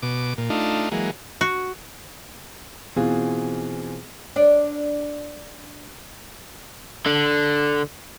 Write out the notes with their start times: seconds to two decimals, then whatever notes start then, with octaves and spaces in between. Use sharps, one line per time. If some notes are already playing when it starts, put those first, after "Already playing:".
0.02 B2 D6
0.38 A#2
0.50 A3 D4 D#4 F4
0.92 E3 F#3 G#3 A#3
1.41 F#4
2.96 B2 E3 C4 F4 G#4
4.36 D4 D5
7.06 D3